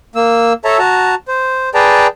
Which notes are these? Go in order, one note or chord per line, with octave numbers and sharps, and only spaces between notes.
A#3 E6
A4 C#5 E5 A5 A#5
F#4 A5 A#5
C5
G#4 B4 D5 G5 A5 A#5